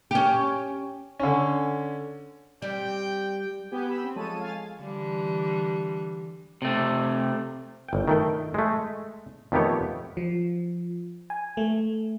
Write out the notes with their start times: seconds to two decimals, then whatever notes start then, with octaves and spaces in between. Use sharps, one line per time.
0.11 C#4 G4
1.20 D3 C#4
2.62 G3 C4 D5 G5
3.71 B3 G4 G#5 G6
3.87 B5 E6
4.04 C4
4.16 F3 G#3 A4 C#5 A5 D#7
4.41 F5 G#5 A6
4.81 D3 E3 G3
6.62 C3 A3
7.89 G1 G5
8.08 D#3 A3 G5
8.54 G#3 A3
9.52 F2 D#3 A3 B3 G4 C#5
10.17 F3
11.30 G#5
11.57 A3